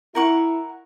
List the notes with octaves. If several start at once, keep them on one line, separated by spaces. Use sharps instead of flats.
E4 A#4 F#5 C#6